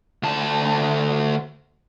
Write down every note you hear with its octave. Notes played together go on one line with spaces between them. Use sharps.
D2 A5